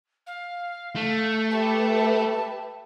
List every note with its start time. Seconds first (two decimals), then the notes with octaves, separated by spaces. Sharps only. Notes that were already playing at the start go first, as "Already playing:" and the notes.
0.27 F5
0.95 A3
1.51 G4 B4 E5 A5